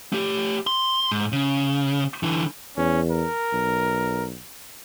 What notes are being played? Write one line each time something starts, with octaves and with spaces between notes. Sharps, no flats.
A3 G4
C6
G#2
C#3
D3 E3
E2 C#4
A#4
B1